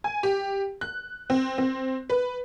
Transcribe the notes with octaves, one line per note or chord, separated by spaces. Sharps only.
G#5
G4
F#6
C4
C4
B4